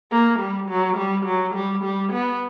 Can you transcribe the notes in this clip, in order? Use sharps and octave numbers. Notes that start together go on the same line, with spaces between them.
A#3
G3
F#3
G3
F#3
G3
G3
B3